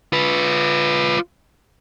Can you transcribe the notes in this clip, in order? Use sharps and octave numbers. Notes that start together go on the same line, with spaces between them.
F4 B4